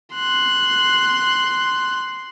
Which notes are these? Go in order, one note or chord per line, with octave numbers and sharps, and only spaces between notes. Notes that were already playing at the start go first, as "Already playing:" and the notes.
C6 F#6